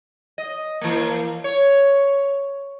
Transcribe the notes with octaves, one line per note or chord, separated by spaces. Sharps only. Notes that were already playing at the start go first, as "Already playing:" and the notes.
D#5
E3 A#3
C#5